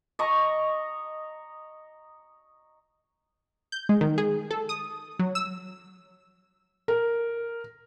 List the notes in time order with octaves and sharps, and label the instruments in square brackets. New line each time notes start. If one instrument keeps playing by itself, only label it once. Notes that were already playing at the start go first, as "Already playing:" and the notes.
[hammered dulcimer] D#5 A#5 C#6
[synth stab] G6
G#3
D#3
G#4
A4
D#6
F#3
E6
[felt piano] A#4